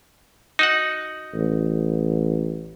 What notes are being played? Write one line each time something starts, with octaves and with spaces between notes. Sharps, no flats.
D#4 F#4 F#5
A1